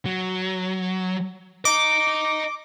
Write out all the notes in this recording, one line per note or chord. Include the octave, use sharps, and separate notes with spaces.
F#3
D#5 A#5 D6